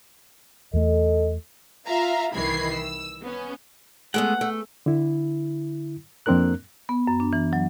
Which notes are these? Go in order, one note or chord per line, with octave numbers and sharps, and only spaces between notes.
E2 A3 A4 D#5
F4 E5 F5 A#5
C2 D#3 E3 B5 G#6 C7
E6
B3 C#4
G#3 A3 B3 F#5
A3
D3 E4
F2 A#3 C4 D4 A#4 F#6
B3
F#2
D4
E3
F#3